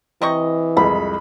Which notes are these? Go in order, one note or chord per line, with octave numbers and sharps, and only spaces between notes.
C3 E3 D#5 C#6
C2 F2 G#3 B5